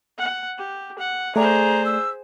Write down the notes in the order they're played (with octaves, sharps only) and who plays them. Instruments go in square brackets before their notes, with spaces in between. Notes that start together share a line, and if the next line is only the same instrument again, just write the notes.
[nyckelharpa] F#5
G4
F#5
[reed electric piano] A3 D5 [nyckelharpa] G#4 C5 [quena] A#5
[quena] E6